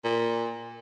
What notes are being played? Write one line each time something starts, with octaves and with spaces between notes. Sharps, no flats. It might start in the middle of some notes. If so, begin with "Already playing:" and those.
A#2